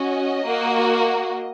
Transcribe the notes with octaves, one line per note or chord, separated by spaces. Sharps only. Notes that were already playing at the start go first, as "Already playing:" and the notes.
Already playing: C#4 F#4 D#5
A#3 F#4